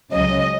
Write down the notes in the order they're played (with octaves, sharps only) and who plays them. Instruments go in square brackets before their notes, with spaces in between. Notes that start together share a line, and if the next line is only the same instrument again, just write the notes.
[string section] C#2 C#3 F#3 D#5